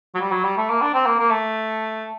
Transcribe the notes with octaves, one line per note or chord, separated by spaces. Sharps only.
F#3
G3
F#3
G3
A3
A#3
D4
C4
A#3
A#3
A3